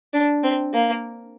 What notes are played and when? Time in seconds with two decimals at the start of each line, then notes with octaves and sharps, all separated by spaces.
0.13 D4
0.43 C4
0.74 A#3